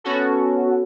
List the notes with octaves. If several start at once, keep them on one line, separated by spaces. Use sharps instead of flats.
B3 C#4 F#4 A4